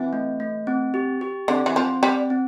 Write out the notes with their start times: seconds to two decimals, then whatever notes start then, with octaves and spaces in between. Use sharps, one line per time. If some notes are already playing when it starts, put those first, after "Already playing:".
Already playing: E3 C4
0.13 A3
0.40 A3
0.67 C4
0.94 G4
1.21 G4
1.48 D3 C4
1.66 E3
1.76 F3 C4
2.03 G3 C4
2.30 C4